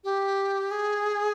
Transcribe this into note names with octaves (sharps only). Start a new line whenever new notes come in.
G4
G#4